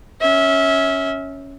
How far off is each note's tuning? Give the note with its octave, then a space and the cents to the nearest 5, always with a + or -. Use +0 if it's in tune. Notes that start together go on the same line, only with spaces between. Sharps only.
C#4 +0 E5 -25